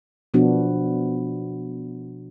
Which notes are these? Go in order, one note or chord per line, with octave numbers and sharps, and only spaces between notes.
B2 F3 B3 D4 F#4